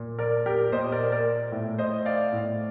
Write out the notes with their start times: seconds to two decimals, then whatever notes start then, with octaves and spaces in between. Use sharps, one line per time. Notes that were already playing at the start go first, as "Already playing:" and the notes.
Already playing: A#2
0.19 A#4 D5
0.46 G4 A#4
0.72 A#2 C5 D#5
0.92 A#4 D5
1.12 A#4 D5
1.52 A2
1.78 C5 D#5
2.05 D5 F5
2.33 A2